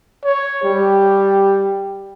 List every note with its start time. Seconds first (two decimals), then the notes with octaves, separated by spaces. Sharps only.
0.24 C#5
0.63 G3 G4